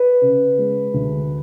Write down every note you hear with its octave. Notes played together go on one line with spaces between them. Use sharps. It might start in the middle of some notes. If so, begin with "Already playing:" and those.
Already playing: B4
C#3
G#3
D2